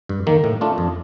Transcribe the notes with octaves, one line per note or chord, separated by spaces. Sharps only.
G2
D#3 A#3
A2
A3 D4 F4
F2